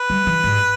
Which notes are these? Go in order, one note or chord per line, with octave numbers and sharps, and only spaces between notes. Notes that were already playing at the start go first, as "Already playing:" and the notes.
Already playing: B4
G3
E3
G#2